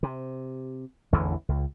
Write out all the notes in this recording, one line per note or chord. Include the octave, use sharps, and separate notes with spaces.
C3
A1 E2 D3 E3
C#2